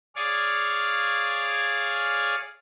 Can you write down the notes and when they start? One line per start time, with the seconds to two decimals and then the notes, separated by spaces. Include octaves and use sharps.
0.16 G#4 C#5 D5 F5